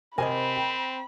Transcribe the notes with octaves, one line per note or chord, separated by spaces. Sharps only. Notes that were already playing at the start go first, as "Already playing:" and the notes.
C3 C4 A#4 C5 D#5 G#5 B5
G5